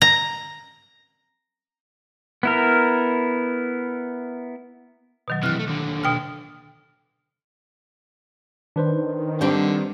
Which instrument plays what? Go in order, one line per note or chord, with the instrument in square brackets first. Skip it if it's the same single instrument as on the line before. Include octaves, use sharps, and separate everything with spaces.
[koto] A#5
[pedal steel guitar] B3 E4 A#4
[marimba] B2 D#3 F#3
[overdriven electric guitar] C3 E3 [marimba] F6 F#6
[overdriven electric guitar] G#3 A3
D#2 D3
[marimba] B2 G5 F6
[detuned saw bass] D#3 [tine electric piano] D4 B4 C5
[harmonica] D3 [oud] G3 C4